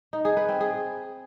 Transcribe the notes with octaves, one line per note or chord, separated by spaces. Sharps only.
D#4
G#4
B4
C4
G#4